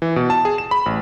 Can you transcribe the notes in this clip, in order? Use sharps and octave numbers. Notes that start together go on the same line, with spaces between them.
E3
B2
A5
G#4
E7
B5
A1